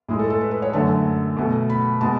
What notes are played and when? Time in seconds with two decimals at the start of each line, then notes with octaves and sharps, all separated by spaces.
0.09 A2 G#3 G#4
0.19 A4
0.30 A4
0.41 B4
0.51 B4
0.62 C#5
0.73 F#2 D3 A3 A5
1.37 B2 A3
1.70 B5
2.01 B2 G#3 A5